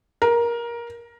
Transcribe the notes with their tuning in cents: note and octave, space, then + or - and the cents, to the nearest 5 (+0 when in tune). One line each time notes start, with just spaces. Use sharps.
A#4 +15